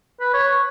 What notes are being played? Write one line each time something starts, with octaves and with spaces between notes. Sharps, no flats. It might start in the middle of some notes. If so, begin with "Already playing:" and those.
B4
C#5